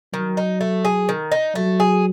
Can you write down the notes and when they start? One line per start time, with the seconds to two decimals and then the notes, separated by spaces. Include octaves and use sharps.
0.13 D#3 F#3
0.37 D#4
0.61 A3
0.85 G#4
1.09 D#3
1.32 D#4
1.55 F#3 A3
1.80 G#4